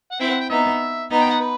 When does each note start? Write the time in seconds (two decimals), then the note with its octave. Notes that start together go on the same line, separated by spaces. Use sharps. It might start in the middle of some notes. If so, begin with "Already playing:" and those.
0.12 F#5
0.20 C4 E4 G5
0.30 F#5
0.40 G5
0.50 B3 D#4 E5
1.10 B3 D#4
1.20 G5
1.31 F#5
1.41 B4